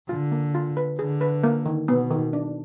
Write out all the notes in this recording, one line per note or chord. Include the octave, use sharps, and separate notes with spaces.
D3 F4
A#3
F4
B4
D3 G#4
B4
A#3
D#3
B2 B3
D#3
D4